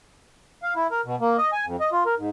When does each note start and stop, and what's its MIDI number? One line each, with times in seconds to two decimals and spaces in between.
0.63 0.74 77
0.76 0.87 64
0.91 1.01 70
1.05 1.16 47
1.21 1.37 58
1.38 1.51 75
1.52 1.65 80
1.66 1.76 41
1.80 1.90 75
1.92 2.04 65
2.06 2.15 70
2.19 2.29 44